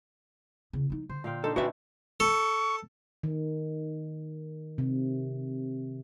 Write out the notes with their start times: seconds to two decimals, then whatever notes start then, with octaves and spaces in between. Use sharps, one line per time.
0.73 E2 C#3
0.90 F3 D#4
1.09 D3 C5
1.24 A#2 F5 G5
1.44 D4 D#4 A4 C5
1.56 D3 C#4 E4 F#4 B4 E5
2.20 A4 C#6
3.23 D#3
4.78 C3